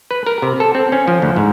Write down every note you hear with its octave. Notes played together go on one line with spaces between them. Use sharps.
B4
A#4
C3
A4
C4
C#4
F3
D2
G#2